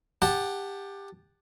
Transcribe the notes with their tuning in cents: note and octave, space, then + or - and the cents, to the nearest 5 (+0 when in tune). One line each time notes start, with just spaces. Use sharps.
G4 +20 F#5 +0 A5 -5